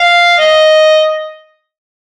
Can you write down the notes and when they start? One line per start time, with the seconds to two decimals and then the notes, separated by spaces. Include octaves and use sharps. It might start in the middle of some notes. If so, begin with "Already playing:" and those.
Already playing: F5
0.38 D#5